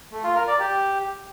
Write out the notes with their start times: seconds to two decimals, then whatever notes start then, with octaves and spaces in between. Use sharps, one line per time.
0.12 A3
0.24 F4
0.36 A#4
0.48 D5
0.60 G4